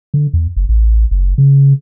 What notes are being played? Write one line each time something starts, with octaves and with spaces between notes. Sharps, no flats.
D3
E2
F#1
A1
F#1
C#3